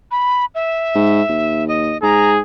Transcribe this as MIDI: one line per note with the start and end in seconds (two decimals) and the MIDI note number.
0.11 0.45 83
0.55 1.66 76
0.95 1.22 44
1.29 1.96 39
1.68 1.98 75
2.03 2.40 44
2.03 2.41 68
2.03 2.31 82